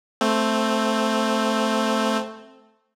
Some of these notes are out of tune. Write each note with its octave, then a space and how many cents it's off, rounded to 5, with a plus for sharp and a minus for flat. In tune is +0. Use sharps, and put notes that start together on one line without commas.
A3 +0 C4 +0